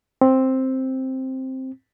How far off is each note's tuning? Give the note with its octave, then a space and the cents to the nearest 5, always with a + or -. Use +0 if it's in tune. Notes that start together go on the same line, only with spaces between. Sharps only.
C4 +5